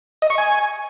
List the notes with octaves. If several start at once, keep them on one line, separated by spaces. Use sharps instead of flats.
D#5
C#6
G#5